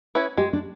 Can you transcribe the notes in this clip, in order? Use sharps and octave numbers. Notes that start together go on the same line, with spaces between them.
C#4 E4 G#4 B4
G#3 G4
D4